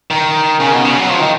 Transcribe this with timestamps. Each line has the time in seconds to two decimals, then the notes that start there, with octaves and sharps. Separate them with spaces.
0.11 D#3
0.60 C#3
0.73 B2
0.85 C#3
0.97 F#3
1.09 F3
1.20 D#3